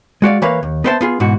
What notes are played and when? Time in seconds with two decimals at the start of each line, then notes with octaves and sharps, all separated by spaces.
0.22 G#3 F#4 D5 F5
0.42 E3 A#3 B4 C#5 F5
0.63 D#2
0.84 B3 B4 C5 E5 F#5 A5
1.01 B3 F4 G#4
1.20 G#2 B2 E3 F#4